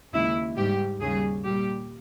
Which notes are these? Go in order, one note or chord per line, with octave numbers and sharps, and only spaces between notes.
D#2 C#3 G#3 E4
G#2 G3 G4
D#2 C#3 G3 G#4
A#2 G3 G4